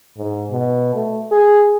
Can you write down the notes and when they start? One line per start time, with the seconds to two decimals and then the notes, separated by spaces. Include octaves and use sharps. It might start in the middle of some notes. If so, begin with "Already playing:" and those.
0.17 G#2
0.51 B2
0.95 A3
1.31 G#4